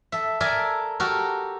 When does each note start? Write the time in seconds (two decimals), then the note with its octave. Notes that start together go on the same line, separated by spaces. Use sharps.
0.12 A4 E5
0.40 A4 A#4 D5 E5 G#5
1.00 F#4 G4 A4 A#4